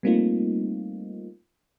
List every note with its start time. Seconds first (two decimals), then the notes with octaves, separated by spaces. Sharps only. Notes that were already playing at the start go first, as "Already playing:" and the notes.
0.03 G3 A3 A#3 C4 D#4 F4